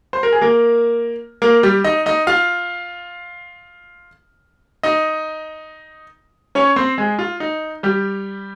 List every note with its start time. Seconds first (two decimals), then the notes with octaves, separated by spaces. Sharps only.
0.13 C5
0.23 A#4
0.32 G#4
0.41 A#3 A#4
1.42 A#3 A#4
1.63 G3 G4
1.84 D#4 D#5
2.06 D#4 D#5
2.27 F4 F5
4.83 D#4 D#5
6.55 C#4 C#5
6.76 C4 C5
6.98 G#3 G#4
7.19 F4
7.40 D#4
7.83 G3 G4